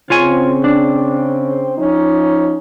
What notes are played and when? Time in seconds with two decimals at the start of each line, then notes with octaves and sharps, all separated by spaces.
0.10 C#3 C4 F4 C#5 G#5
0.64 D4
1.78 F3 C#4 D#4